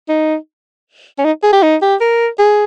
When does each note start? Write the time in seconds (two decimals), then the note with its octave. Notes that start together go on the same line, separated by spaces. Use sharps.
0.09 D#4
1.18 C#4
1.25 D#4
1.43 G#4
1.52 G4
1.62 D#4
1.82 G4
2.01 A#4
2.39 G#4